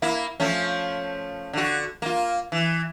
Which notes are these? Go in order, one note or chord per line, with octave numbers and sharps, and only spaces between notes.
A#3 E4
F3 A3 C#4
D3 F#4
A#3 F4
E3